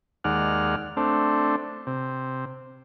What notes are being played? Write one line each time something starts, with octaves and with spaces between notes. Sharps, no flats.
D#2 G#3 D5 F#5 F6
A3 C4 D4
C3